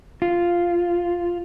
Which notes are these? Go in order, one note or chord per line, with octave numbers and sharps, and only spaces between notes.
F4